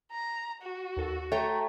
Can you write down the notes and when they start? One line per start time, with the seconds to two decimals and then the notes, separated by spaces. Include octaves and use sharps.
0.11 A#5
0.61 F#4
0.97 D#2 A4
1.32 A3 C#5 G5 A#5